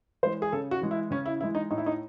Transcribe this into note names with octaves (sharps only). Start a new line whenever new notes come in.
E3 G#3 C5
G#4
C#3 A4
F#4
E3 G#3
E4
C#3 C#4
E4
E3 G#3 E4
D#4
A2 D#4
E4
D#4